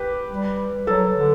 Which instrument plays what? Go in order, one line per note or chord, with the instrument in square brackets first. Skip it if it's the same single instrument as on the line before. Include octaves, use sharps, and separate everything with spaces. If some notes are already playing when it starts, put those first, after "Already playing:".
Already playing: [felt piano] G4 B4
[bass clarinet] G3
[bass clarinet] F#3 [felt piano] A4
[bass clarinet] D3